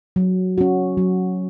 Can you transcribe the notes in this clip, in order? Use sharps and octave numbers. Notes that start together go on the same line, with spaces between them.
F#3
C#4 F#4
F#3